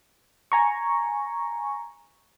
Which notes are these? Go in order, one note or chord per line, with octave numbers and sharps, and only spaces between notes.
G#5 A#5 C#6